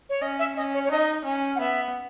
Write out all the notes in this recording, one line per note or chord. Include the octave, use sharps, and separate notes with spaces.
C#5
C#4 D#5
E5
C#4 D#5
C#5
C#5
D#4 D#5
C#4
F#5
B3 E5